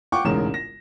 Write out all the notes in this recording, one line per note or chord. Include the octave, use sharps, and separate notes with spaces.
F4 F#5 G5 C#6 D6
E1 A1 G#2 C#3 A#4 E7
A#6